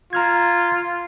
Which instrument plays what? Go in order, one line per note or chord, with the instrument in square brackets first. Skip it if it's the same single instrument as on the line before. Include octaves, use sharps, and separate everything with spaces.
[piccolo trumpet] F4 [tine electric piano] A#5 F6 G#6